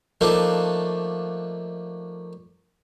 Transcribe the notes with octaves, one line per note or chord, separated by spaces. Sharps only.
F3 A3 A#3 D4 D#4